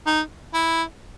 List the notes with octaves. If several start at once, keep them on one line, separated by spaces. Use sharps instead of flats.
D#4
E4